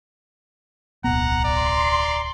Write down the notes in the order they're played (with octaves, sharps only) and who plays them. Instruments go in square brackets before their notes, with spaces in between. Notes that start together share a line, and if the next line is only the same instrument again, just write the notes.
[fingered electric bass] D1 B1 B3 [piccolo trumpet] F#5 [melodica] A#5
[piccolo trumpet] D5 [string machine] C6